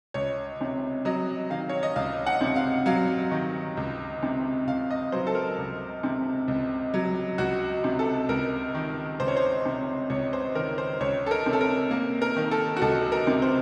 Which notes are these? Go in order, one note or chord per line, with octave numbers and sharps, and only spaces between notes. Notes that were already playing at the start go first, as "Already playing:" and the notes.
C#2 C#5
C3
F#3 D#5
D#3 F5
C#5
D#5
C#2 F5
F#5
C3
F5
F#3 F5
D#3
C#2
C3
C#2 F5
D#5
F#3 C5
A4
A#4
C#2
C3
C#2
F#3
C#2 F#4
C3
A4
C#2 A#4
D#3
C#2 C5
C#5
C5
C3
C#2 C#5
C5
D#3 A#4
C5
C#2 C#5
A4
A#4
C3
A4
A#4
A#3
A#4
D#3
A4
F#4
C#2 A4
A#4
C3
C5